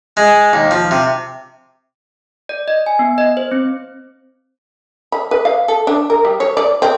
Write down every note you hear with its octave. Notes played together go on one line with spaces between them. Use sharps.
G#3
D#2
F3
C3
D5
D#5
G#5
B3
D#5
C5
C4
B5
B4
F5
A4
D4
A#4
G3
C#5
D5
C4